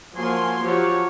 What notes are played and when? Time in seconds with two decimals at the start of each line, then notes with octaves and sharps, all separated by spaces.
0.15 F3 F#3 A#3 G#5 C6
0.62 F3 F#3 G4 C#5